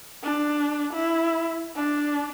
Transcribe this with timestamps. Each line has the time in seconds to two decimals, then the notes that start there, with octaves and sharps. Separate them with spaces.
0.23 D4
0.93 E4
1.76 D4